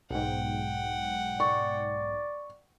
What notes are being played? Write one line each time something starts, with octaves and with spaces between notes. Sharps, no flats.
B1 G#2 F#5 G5
D5 C#6